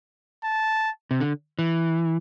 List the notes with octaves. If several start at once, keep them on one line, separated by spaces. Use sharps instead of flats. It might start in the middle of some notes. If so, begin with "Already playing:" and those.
A5
C3
D3
E3